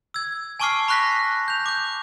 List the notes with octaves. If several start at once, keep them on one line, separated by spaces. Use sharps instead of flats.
E6 G#6
G#5 A5 C#6 D6 F6 C7
B5 C#6 F#6 A#6 B6
G6 F7
D6 G6